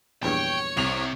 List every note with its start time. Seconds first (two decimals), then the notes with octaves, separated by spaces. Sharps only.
0.23 A#1 E2 G2 C#5 G5 C#6
0.77 C2 C3 F7